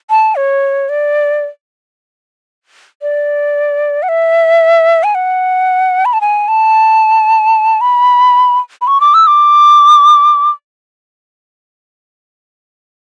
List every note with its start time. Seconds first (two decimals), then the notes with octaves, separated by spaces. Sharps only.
0.10 A5
0.36 C#5
0.89 D5
3.02 D5
4.03 F#5
4.09 E5
5.04 G#5
5.15 F#5
6.05 B5
6.13 A5
6.21 G#5
6.48 A5
7.81 B5
8.81 B5
8.87 C#6
9.01 D6
9.14 E6
9.27 D6